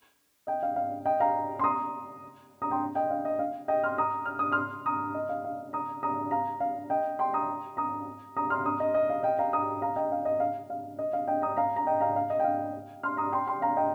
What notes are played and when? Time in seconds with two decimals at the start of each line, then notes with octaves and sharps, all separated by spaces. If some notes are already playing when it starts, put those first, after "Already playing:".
0.47 D#5 G5
0.63 F5
0.76 F5
1.06 D#5 G5
1.20 F5 A#5
1.59 C6
1.64 A#5 D#6
2.62 A#5 D#6
2.71 G5 C6
2.95 D#5 G5
3.10 F5
3.25 D#5
3.39 F5
3.68 D#5 G5
3.84 C6 F6
3.98 A#5 D#6
4.26 F6
4.39 D#6
4.52 C6 F6
4.86 A#5 D#6
5.14 D#5
5.29 F5
5.44 F5
5.73 A#5 D#6
6.03 A#5 D#6
6.31 F5 A#5
6.60 F5
6.90 D#5 G5
7.19 G5 C6
7.33 A#5 D#6
7.77 A#5 D#6
8.37 A#5 D#6
8.50 C6 F6
8.65 A#5 D#6
8.80 D#5
8.94 D#5
9.10 F5
9.23 D#5 G5
9.39 F5 A#5
9.53 A#5 D#6
9.82 F5 A#5
9.96 D#5 G5
10.12 F5
10.25 D#5
10.40 F5
10.70 F5
10.99 D#5
11.13 F5
11.28 D#5 G5
11.42 A#5 D#6
11.57 F5 A#5
11.76 A#5
11.87 D#5 G5
12.00 F5 A#5
12.16 F5
12.30 D#5
12.40 G5
12.44 F5
13.03 C6 F6
13.17 A#5 D#6
13.32 G5 C6
13.47 G5 C6
13.62 F5 A#5
13.77 D#5 G5